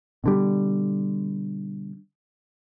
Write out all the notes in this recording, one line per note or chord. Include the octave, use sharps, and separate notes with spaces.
B2 D3 G3